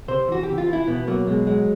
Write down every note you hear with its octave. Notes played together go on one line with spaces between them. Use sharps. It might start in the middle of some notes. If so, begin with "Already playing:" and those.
C3 C5
E3 F#4
C3 G4
F4
E3 E4
B2 B3
F#3 A#3
B2 G#3
F#3 G#3